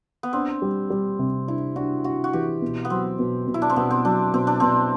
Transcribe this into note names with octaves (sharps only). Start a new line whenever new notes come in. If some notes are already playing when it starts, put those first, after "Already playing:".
B3
C4 D4
G3
G3
C3
D4 E4
D4 F#4
D4 F#4
F#4
E3 G4
B2
B3
F#3 C4
B2
B2
E4
D4
C4
B2 B3
C4
F#3 D4
B2 C4
D4
B2 C4